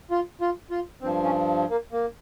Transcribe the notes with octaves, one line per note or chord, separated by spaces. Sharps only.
F4
F4
F4
G2 F3 C4
C#4
A#3
A#3